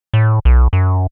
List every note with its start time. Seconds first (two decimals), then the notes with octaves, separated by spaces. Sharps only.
0.13 A2
0.45 B1
0.73 F#2